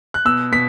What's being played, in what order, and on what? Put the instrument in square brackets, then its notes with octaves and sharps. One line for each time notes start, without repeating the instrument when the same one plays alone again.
[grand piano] F#6
B2 E6
B2 B6